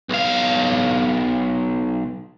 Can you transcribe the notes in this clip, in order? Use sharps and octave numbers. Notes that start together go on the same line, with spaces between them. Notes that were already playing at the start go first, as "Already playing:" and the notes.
B1 F5